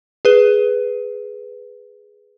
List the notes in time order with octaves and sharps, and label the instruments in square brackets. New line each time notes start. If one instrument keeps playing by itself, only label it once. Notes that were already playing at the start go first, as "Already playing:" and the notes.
[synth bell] G#4 B4